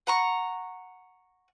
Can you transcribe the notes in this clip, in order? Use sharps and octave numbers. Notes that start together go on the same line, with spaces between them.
F#5 A#5 C#6